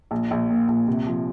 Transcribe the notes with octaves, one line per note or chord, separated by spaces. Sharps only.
A#1
A#1
A#2
A#1
C3
F3